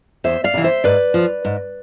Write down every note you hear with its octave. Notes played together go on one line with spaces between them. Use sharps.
E2 C5 E5
D5 F5
C3 E3
C5 E5
G#2 B4 D5
F3
G#2